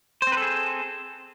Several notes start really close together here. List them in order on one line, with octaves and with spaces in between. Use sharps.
C5 C4 B4 A4 G#4